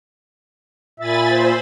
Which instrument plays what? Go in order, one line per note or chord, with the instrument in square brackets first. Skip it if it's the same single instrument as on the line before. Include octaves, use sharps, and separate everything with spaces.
[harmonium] A#2 E5 [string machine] G#5 B5 A6
[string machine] C5